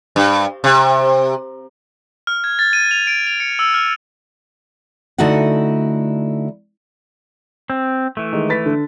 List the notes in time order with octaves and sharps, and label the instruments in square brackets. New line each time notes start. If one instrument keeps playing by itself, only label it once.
[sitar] G2
C3
[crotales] F6
G#6
A6
D#7
F7
D7
F7
C#7
E6
F6
[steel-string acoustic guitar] D3 A3 D#4 E4 F#4 F#5
[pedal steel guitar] C4
E3 A3
[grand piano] D#3 G#3
B4 A6 B6
D3